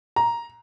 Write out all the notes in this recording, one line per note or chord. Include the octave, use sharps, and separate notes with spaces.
A#5